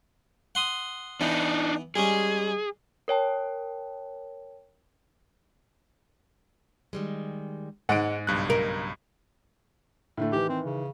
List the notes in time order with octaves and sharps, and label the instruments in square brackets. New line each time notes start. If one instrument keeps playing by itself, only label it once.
[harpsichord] F#5 C6 D#6
[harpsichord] E3 B3 [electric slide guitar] D4 D#4
[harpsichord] G3 G#3 C#4 [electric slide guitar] G#4
[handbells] A#4 C#5 G5 A5
[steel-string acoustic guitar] D#3 G3 G#3
[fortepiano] G#2 [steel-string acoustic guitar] G#3 D#4 C#5 [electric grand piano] F#5 D7
[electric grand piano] B1 G2 F#6 [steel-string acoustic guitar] C#3
[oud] A#4
[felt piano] A2 D3 A3
[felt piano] D#3 E3 [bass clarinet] G4
[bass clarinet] C4
C#3